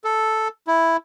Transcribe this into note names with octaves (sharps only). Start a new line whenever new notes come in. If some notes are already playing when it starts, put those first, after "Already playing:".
A4
E4